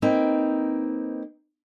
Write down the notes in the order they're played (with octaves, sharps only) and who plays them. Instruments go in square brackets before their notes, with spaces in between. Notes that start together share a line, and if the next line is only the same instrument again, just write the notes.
[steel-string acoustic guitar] A#3 C4 D#4 B4